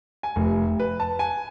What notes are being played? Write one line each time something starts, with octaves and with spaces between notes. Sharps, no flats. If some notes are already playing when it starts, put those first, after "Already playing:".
G#5
F1
B4
A5
G#5